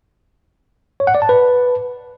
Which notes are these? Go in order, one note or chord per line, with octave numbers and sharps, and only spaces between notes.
C#5
F#5
D5
A5
B4